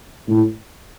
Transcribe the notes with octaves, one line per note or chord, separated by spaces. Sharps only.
A2